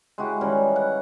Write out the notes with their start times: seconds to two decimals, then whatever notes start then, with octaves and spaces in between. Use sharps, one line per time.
0.18 G#3 E4 F#4 G4
0.41 D#3 E3 G3 C#4
0.76 F#5